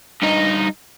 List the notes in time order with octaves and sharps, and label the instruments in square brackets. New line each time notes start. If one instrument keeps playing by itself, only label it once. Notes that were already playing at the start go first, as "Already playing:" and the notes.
[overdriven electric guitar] G2 D#4